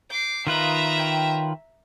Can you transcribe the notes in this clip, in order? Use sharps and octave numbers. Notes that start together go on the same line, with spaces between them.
D6 G6 C7
D#3 A#3 F4 B4 D#5 E5 A#5
C#5 G5